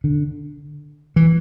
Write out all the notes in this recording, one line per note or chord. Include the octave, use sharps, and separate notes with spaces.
D3
E3